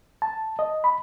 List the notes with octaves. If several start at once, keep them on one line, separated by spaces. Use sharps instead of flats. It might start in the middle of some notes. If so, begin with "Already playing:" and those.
A5
D#5
B5